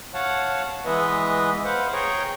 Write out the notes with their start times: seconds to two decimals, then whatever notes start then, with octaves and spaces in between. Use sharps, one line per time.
0.14 C#5 F5 F#5 A5
0.86 E3 G#3 B3 B4 D#5 E5
1.65 B4 C5 F5 F#5
1.93 G#4 C#5 G5 A#5 C#6